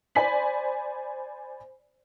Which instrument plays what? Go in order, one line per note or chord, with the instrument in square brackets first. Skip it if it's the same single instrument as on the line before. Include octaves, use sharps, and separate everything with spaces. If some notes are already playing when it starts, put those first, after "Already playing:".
[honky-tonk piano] C5 D5 G#5 B5 B6 F#7